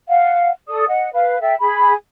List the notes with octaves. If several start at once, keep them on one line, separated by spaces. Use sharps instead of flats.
F5 F#5
A4 D5 D#6
D#5 F#5
B4 F5
A4 E5 G5
G#4 B5